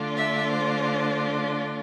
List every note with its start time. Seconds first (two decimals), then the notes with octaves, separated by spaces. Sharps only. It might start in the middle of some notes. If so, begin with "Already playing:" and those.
Already playing: D3 A3 D4 F4
0.17 E5
0.52 C5